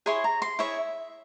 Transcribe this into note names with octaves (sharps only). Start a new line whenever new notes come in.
E4 G#4 C#5 C6
A#5
C6
E4 G#4 C#5 E5